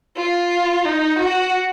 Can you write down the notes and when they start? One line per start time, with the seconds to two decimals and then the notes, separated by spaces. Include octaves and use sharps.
0.17 F4
0.85 D#4
1.19 F#4